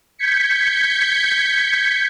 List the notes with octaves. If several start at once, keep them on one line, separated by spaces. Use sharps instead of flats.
G6 G#6 B6 C#7